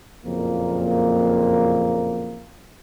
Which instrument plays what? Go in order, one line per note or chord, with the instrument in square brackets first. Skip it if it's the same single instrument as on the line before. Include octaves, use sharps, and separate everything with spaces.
[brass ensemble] F#1 F2 A#2 A#3